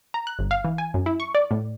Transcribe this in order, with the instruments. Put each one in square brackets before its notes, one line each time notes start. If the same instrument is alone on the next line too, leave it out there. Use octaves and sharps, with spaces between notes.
[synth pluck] A#5
F#6
G1
F5
E3
G#5
F#2
E4
C#6
D5
A2